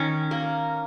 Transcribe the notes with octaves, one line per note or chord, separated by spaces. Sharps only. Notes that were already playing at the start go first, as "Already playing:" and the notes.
Already playing: D#3 C#4
A#3